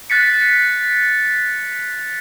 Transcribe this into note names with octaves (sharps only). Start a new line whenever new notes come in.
F#6 A6 B6 C#7